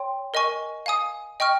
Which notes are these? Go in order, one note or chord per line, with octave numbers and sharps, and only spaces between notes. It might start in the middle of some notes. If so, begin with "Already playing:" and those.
Already playing: C#5 G5 C6
A#4 D#5 G#5 C#6
F5 G#5 D#6
D#5 G5 C#6 F6